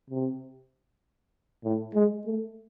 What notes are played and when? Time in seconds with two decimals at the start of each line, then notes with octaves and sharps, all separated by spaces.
0.10 C3
1.64 A2
1.94 G#3
2.26 A3